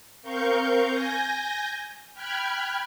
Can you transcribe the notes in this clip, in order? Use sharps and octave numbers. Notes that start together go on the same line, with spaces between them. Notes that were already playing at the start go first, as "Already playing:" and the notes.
C4 A#4 F5 C#6 G6
G#5 G6 A#6
G5 B5 F6 F#6 G#6